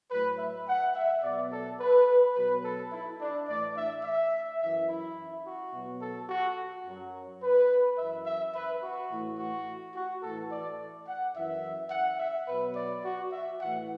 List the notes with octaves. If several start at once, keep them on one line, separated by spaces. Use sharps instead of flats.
A2 F#3 B4
E5
F#5
E5
B2 F#3 D5
A4
B4
B2 F#3 B4
A4
E4
D4
A2 E3 D5
E5
E5
F#2 E3 E5
E4
F#4
B2 F#3
A4
F#4
F#2 F#3
B4
F#2 E3 E5
E5
B4
F#4
A2 E3
F#4
F#4
A2 E3 A4
D5
F#5
F#2 E3 E5
F#5
E5
B2 F#3 B4
D5
F#4
E5
A2 E3 F#5